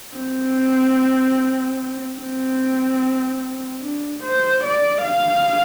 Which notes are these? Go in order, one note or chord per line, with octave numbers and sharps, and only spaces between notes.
C4
C4
D4
C5
D5
F5